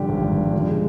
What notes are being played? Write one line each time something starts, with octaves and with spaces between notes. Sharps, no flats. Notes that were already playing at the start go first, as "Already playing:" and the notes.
Already playing: G2 D3 F3 G4
G#1
G2
F3
D3
G#3